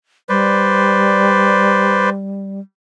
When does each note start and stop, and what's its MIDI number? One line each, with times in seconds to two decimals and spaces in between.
0.29 2.60 55
0.29 2.10 71
0.29 2.10 72
0.29 2.10 74